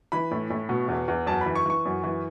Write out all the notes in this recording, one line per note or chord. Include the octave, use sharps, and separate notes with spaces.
E3 B5
A2
A2
B2
E2
E2
F#2 A5
B5
E3
C#6
E3 C#6
F#2
E3